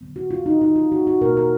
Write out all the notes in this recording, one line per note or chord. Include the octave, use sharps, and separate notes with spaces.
D3 F#3 B3
F#4
F4
D#4
D#4
F4
F#4
F#4
B2 A#3 A#4
A#4